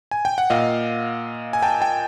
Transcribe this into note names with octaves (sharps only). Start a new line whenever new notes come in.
G#5
G5
F#5
A#2 D#5 F5
G#5
G5 A5
G5 A5